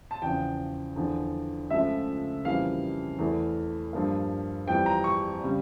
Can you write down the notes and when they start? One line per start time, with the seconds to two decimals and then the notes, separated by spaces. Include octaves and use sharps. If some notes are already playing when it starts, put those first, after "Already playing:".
0.11 A5
0.22 E2 C#3 F3 G5
0.96 E2 D3 F3
1.70 C#2 C#3 F3 A3 E5
2.45 F2 C#3 E3 G3 A#3 F5
3.19 E2 E3 A3
3.93 G2 F3 A#3
4.67 F2 E3 G3 G5
4.86 A#5
5.04 C#6
5.43 C#3 G3